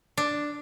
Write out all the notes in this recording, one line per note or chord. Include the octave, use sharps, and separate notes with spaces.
D4